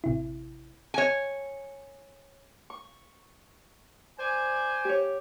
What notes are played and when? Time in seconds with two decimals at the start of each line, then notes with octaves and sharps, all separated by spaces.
0.04 A1 C3 E4
0.94 C#5 G#5
2.70 C#6
4.20 C5 D5 G#5
4.85 G4 C#5